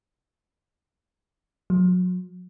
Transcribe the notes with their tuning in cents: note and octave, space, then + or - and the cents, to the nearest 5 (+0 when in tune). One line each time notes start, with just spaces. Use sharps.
F#3 -30